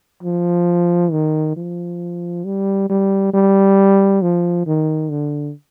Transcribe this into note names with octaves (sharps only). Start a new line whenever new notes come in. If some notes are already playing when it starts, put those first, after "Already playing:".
F3
D#3
F3
G3
G3
G3
F3
D#3
D3